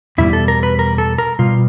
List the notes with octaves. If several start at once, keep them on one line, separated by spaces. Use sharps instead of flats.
E2 B2 G3 E4
A4
A#4
B4
A#4
A4
A#4
B2 G3 F4